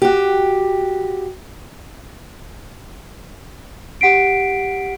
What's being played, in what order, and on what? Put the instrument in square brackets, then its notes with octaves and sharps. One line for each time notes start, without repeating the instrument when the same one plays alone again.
[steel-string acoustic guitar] F#4 G4
[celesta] G4 F#5 B6 C7 D7